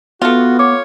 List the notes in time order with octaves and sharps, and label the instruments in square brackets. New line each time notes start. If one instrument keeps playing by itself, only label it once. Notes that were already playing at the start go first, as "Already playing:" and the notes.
[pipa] A3 F4 [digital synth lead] B3 [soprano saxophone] F#4
[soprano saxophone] C#5 [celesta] D6